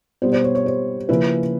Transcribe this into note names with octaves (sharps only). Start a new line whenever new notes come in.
B2 G3 B3 C5
C5
C#5
C#5
C5
C#3 F3 A#3 C#4 E4 B4